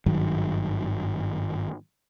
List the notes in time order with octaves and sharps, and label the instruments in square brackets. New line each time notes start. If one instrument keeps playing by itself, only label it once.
[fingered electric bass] G#1 G2 D#3 F#3